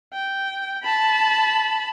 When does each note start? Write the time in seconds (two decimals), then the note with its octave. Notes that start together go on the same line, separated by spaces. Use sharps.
0.13 G5
0.83 A5 B5